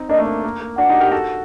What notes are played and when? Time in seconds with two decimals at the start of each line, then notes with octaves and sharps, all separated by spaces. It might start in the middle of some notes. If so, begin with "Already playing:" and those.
Already playing: C4 D#4
0.09 A#3 D4 D#5
0.19 A3
0.26 A#3
0.44 A#3
0.60 A#3
0.78 D4 F#4 F#5
0.89 D#4 G4
1.00 G4 A#4
1.12 F#4 A4